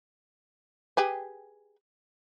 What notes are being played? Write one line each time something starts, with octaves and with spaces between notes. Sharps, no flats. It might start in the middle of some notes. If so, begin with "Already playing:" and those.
G4 G#4 B4